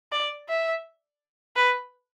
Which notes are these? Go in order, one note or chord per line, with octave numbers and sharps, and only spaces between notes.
D5
E5
B4